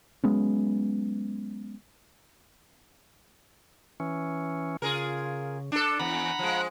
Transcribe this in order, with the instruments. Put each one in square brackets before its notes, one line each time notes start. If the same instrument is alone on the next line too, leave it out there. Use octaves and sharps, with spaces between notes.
[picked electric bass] F#3 G#3 B3 C#4
[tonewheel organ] E3 C#4
[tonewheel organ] C#3 [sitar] F4 G#4 A#4
[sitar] D4 A4
[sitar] E2 [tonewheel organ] F#5 A#5 B5
[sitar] F3 G#3